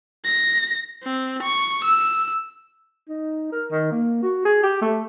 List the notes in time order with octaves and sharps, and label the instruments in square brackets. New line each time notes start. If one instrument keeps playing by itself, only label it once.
[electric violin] A#6
C4
C#6
E6
[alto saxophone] D#4
A#4
D#3
A#3
F#4
G#4
G4
A3